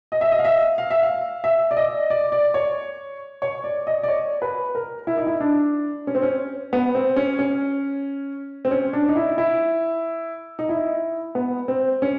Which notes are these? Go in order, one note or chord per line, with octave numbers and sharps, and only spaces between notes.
D#5
E5
D#5
F5
E5
F5
E5
F5
E5
D5
D#5
D5
D5
C#5
C#5
D5
D#5
D5
C#5
B4
A#4
E4
D#4
E4
D4
C#4
C4
C#4
B3
C4
C#4
C#4
C4
C#4
D4
D#4
E4
E4
D#4
E4
B3
C4
C#4